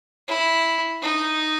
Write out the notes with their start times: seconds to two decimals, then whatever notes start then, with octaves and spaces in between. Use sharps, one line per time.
0.28 E4
1.02 D#4